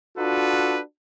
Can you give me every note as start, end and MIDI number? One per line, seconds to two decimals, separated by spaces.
0.17 0.79 62
0.17 0.79 65
0.17 0.79 66
0.17 0.79 69
0.17 0.79 71